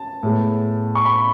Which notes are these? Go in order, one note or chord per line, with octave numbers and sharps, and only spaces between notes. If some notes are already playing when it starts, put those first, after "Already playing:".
Already playing: A5
A2 G#3 B3
C#6
B5